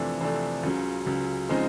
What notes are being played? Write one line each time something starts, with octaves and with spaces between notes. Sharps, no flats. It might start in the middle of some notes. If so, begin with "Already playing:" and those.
Already playing: F2 C3 E3 A3 D4
F2 C3 E3 A3 D4
C#2 C#3 F#3
C#2 C#3 F#3
C#3 F3 G#3 C4 D#4